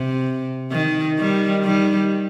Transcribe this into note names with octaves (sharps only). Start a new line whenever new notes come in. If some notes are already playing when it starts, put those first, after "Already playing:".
Already playing: C3
D#3
D#3 G3
D#3 G3